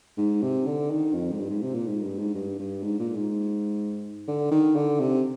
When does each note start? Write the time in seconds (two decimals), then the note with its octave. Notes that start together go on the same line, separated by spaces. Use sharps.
0.17 G#2
0.42 C3
0.66 D3
0.91 D#3
1.14 F2
1.31 G#2
1.39 G2
1.50 G#2
1.62 C3
1.74 A#2
1.87 G#2
2.03 G2
2.19 G#2
2.35 G2
2.59 G2
2.83 G#2
2.99 A#2
3.14 G#2
4.28 D3
4.51 D#3
4.75 D3
5.00 C3